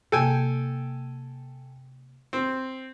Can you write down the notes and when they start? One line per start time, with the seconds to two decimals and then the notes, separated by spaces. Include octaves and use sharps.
0.12 C3 A#3 A4 G5 G#5
2.33 C4